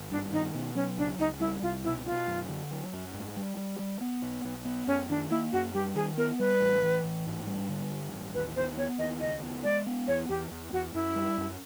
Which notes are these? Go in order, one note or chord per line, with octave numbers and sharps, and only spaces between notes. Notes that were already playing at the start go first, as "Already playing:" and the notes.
Already playing: G#1
G2 D4
D#3 D#4
B2
F#3 C#4
C#2 D4
C#2 D#4
G3 E4
C2 F4
B2 E4
B2 F4
F#2
D3
F#3
F#2
G#2
G3
G3
G3
B3
B1
B1
B3
F#2 C#4
D#3 D4
A#3 E4
F#2 F#4
G3 G4
D#3 G#4
B3 A#4
G3 B4
A1
E3
A1
G#2
G3
D3
G2
A1
D#2 B4
B3 C5
B3 C#5
D#2 D#5
C#2 D#5
B3
G#3 D5
B3
E2 C#5
E2 G4
E2
E2 F#4
F#2 E4
G3
F#2